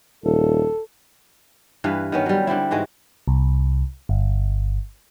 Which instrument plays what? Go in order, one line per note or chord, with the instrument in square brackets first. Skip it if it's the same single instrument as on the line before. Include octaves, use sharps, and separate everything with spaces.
[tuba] D#1 [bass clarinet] A4
[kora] G2 E3 B4 F5
D#3 B3 C#4
F#3 G3
D3 G3 C4 E4
G#2 E3 G#3 F#4
[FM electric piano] C2
G1